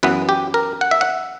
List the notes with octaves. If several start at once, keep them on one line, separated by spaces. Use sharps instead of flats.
F#2 E3 B3 B4
G4
A#4
F#5
E5
F#5